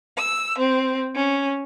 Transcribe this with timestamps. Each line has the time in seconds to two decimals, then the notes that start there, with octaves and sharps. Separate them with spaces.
0.18 E6
0.59 C4
1.15 C#4